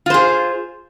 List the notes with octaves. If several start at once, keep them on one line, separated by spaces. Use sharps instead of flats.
F4 G#4 C5